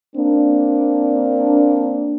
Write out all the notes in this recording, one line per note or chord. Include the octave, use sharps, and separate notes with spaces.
A#3 C4 D4